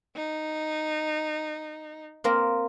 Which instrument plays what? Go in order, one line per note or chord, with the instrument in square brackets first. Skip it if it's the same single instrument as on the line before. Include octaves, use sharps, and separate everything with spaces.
[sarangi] D#4
[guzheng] A#3 C4 A#4